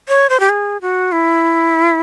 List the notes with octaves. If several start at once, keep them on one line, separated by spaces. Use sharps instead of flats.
C#5
C5
G4
G#4
F#4
E4